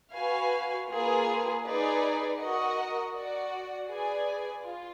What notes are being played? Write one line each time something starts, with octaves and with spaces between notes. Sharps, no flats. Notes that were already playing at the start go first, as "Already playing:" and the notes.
F#4 B4 F5 G#5
A#3 F4 G#4 B4
D#4 G#4 B4 D5
F#4 A#4 D#5 F#5
F#4 D5 F#5
G#4 B4 D5 G#5
F4